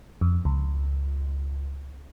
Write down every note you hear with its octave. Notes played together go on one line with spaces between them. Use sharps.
F2
C#2